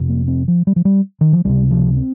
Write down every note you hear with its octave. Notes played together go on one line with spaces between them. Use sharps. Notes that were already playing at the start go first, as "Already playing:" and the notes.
Already playing: F1 F2 C3
A#3
C4
F3
G3
F3
G3
D#3
F3
C#2 C3 G3
F3
C4